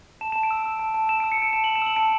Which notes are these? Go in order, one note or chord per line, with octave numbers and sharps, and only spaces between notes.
A5 E7
A5 E7
D7
E6
E6
A5
A5
E6 E7
E6 D7
C#7
A5 D7
A5 E7
E6 F#7
E7
E6 F#7
A5 D7